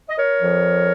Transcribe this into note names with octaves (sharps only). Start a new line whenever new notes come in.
D#5
A#4 C#5
F2 F3